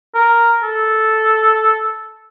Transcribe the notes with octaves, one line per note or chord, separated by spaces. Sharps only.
A#4
A4